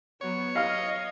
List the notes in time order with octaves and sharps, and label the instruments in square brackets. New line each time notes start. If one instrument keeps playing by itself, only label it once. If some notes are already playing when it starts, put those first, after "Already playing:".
[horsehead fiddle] F#3 B3 [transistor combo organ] C#5
[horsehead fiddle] D#5 [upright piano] F5 F6